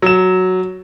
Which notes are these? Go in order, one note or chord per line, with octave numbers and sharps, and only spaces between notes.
F#3 E7